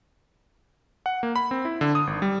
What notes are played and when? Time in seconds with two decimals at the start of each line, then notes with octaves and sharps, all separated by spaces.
1.06 F#5
1.23 A#3
1.36 B5
1.51 C4
1.65 E4
1.81 D3
1.95 D#6
2.07 G#1
2.22 G3